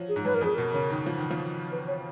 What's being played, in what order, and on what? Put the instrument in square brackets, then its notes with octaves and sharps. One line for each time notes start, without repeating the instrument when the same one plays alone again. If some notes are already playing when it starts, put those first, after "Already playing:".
Already playing: [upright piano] F3 F#3
[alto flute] G#4
[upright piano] G#2
[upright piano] F#2 [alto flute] B4
[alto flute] A#4
[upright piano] F2 [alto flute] G#4
[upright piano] B2 [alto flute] A#4
[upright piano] C#3
D#3
F3
D#3
F3
[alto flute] B4
C#5